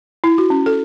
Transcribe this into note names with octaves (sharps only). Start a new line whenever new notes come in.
E4
F#4
C#4
A4